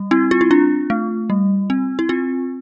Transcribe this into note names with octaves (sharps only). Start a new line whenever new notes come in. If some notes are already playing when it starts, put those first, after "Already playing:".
Already playing: G3
C4 E4
F4
E4
D4 F4
A3
G3
C4
E4
C4 F4